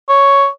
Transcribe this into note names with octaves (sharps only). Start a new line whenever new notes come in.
C#5